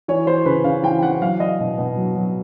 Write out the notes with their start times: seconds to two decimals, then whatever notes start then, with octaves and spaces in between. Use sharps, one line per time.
0.08 E3 C#5
0.27 E3 C5
0.46 C#3 B4
0.64 C#3 F5
0.83 E3 G5
1.03 E3 F#5
1.21 F#3 F5
1.40 F#3 D#5
1.60 B2
1.78 B2
1.97 F#3
2.15 F#3